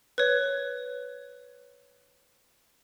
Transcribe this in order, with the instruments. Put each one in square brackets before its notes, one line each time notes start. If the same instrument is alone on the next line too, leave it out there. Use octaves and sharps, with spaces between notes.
[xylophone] B4 C#5